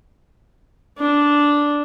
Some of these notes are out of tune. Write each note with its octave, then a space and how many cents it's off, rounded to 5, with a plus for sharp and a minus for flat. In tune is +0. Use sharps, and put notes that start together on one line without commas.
D4 -5